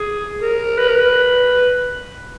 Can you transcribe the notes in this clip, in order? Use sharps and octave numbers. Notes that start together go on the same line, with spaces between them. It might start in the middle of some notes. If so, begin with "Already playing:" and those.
Already playing: G#4
A#4
B4
A#4
B4